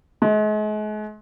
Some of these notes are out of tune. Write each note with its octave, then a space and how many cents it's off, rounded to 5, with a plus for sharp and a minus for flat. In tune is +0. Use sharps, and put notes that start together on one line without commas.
G#3 +40